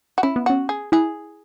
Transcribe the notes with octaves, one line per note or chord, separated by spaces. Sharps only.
F#4
C#4 E4
B3
C#4 F#4
G#4
E4 G#4